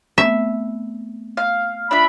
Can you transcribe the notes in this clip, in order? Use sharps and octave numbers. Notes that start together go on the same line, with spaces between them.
A3 B3 C4 E5
F5
D4 F4 E5 B5 F6